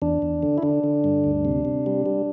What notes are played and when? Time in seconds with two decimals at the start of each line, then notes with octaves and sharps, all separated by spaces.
0.02 E2 D4
0.22 E2
0.43 D3
0.58 E4
0.63 D3 D4
0.84 D3
1.04 G2
1.24 D2
1.45 C3
1.65 C3
1.86 G3
2.06 G3